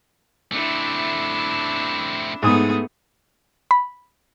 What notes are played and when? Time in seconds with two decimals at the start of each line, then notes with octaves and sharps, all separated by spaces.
0.52 A3 C4 D4 E4
2.42 G#2 A3 B3 G#4 D#6
3.71 B5